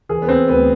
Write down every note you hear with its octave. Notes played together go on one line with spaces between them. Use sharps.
E3 G#4
B3
C4
D2 B3